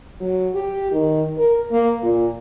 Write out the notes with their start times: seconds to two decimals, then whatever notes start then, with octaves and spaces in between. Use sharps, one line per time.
0.20 F#3
0.55 G4
0.92 D#3
1.38 A#4
1.71 A#3
2.02 A#2